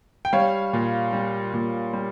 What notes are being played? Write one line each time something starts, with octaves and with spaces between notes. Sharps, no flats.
G5
G3 C#5 F5
A#2
G3
A#2
G3